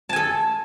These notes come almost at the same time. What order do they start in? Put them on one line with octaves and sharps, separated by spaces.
A5 G#5 A4